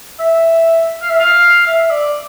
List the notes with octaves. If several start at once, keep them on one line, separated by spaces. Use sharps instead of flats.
E5
F5
E5
F5
E5
D5